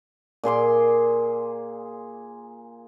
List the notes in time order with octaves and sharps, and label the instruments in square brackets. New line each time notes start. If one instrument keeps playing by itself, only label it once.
[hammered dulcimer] A#2 G#4 C6 D6